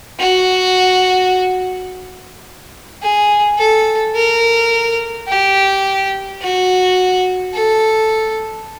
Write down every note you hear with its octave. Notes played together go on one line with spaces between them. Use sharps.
F#4
G#4
A4
A#4
G4
F#4
A4